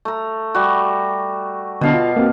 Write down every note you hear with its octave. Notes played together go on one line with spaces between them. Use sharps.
A3 A#5
G3 F#4
B2 D3 B3 D4 F5 A5
F4
A#3 C4 F#4